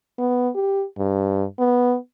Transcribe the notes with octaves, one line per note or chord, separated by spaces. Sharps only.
B3
G4
G2
B3